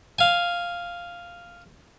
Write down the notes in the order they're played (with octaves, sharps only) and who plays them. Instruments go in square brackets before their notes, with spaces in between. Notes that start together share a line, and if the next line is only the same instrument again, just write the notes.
[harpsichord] F5 G#5